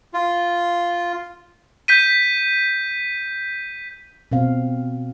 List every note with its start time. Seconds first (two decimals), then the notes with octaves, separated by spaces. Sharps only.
0.14 F4
1.88 G6 B6 D#7
4.32 B2 C4 F5